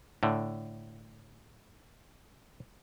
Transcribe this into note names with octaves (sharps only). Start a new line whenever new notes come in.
A2 D3